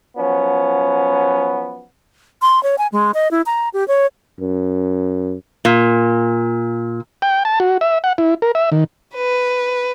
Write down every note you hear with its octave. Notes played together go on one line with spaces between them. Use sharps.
F3 F#3 B3 C#4
C6
C#5
G#5
G#3
D#5
E4
A#5
G4
C#5
F#2
A#2
G5
A5
F#4
E5
F#5
E4
A#4
E5
D#3
B4